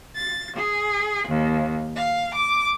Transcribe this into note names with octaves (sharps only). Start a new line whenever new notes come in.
A6
G#4
D#2
F5
D6